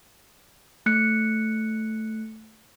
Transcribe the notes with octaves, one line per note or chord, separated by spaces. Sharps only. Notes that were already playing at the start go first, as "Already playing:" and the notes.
A3 F#6 C#7